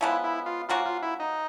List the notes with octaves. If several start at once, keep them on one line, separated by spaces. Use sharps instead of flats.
C#3 F3 G#3 B3 E4
E4
F4
F3 A#3 C#4 F4 F#4
F4
E4
D#4